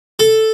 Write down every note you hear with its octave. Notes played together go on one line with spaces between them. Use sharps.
A4